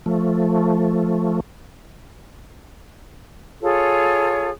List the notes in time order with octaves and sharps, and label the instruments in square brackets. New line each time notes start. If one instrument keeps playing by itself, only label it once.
[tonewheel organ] F3 A3
[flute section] F4 G#4 A4 C#5